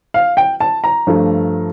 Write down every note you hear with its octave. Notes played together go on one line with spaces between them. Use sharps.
F5
G5
A5
A#5
G2 F3 A3